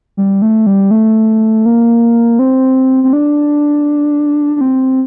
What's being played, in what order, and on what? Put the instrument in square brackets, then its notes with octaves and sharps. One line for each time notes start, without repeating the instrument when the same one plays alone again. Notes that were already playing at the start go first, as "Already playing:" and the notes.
[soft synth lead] G3
A3
G3
A3
A#3
C4
C4
D4
D4
C4